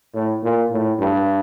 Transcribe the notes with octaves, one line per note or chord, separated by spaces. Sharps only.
A2
A#2
A2
G2